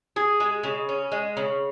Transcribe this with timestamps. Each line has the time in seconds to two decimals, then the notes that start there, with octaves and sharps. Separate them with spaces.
0.16 G#4
0.40 G#3
0.63 C#3
0.89 C#4
1.12 G#3
1.37 C#3